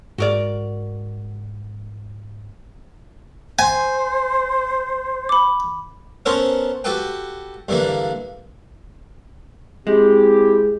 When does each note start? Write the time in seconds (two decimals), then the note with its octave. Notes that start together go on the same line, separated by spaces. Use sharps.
0.18 G#2 F#4 A#4 D5
3.59 C5 G#5
5.29 B5 D6
6.26 B3 C#4 A4 A#4 C5 C#5
6.84 F#4 G4 A4 B4 G5
7.68 G2 D3 E3 A#3
9.87 G#3 C4 E4 G4